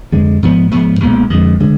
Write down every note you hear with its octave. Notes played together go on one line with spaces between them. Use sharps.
F2 D3 G#3
G#2 F3 B3
G#2 F3 B3
B1 A#2 G#3 B3
F2 D3 G#3
D3 G#3